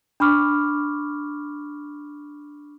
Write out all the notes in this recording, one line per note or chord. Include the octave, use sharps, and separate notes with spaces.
D4 B5 C#6 D6 F6